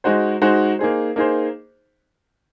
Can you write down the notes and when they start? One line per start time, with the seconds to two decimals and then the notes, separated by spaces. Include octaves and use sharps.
0.04 G#3 D#4 F#4 C5
0.42 G#3 D#4 F#4 C5
0.79 A#3 D#4 G#4 C5
1.16 A#3 D#4 G#4 C5